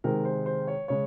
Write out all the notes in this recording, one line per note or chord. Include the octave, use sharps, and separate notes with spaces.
C3 D#3 G#3 A#4
C5
C5
C#5
C#3 G#3 C#5